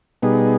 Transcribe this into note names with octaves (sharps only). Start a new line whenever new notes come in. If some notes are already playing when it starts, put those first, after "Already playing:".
B2 G3 B3 D#4 G#4